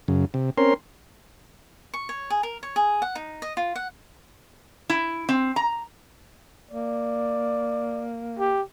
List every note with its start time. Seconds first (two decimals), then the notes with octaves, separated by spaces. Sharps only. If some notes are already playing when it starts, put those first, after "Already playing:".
0.08 F#2 C#3
0.34 C3
0.58 C4 C#4 A#4 C6
1.94 C#6
2.09 C#5
2.30 G#4
2.43 A#4
2.63 C#5
2.76 G#4
3.02 F#5
3.15 D#4
3.42 D#5
3.57 F4
3.76 F#5
4.90 E4
5.29 C4
5.56 A#5
6.71 A#3 D5
8.39 G4